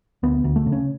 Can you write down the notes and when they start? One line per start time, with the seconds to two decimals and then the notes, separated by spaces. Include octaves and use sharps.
0.23 D2 B3
0.44 D2
0.56 A3
0.66 C#3
0.72 C#4